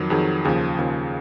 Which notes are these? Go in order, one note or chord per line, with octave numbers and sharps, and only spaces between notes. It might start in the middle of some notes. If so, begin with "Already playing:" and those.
Already playing: F2 D#3 F#3
F2 D#3 F#3 G#4
D#2 C#3 F3 G#4
D#2 C#3 F3